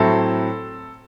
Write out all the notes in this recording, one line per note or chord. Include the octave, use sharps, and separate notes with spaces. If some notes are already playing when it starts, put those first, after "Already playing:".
Already playing: A2 F#3 C4 E4 A4